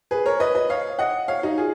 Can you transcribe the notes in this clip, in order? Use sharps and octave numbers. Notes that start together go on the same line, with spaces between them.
G#4 B4
A#4 C#5
B4 D#5
B4 D#5
C#5 F5
D#5 F#5
C#5 F5
D#4 F#4
F4 G#4